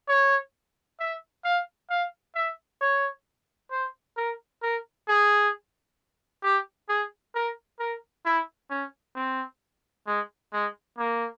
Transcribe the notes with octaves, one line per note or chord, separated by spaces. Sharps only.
C#5
E5
F5
F5
E5
C#5
C5
A#4
A#4
G#4
G4
G#4
A#4
A#4
E4
C#4
C4
G#3
G#3
A#3